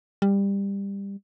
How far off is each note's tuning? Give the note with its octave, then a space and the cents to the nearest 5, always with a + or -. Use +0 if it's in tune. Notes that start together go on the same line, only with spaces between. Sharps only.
G3 +20